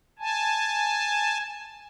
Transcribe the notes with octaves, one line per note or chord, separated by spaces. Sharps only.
G#5 A5